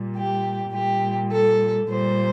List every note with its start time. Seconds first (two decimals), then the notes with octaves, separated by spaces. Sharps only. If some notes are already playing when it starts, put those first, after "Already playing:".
Already playing: A#2 G3
0.15 G4
0.73 A#2 G3 G4
1.31 A4
1.89 A#2 G3 C5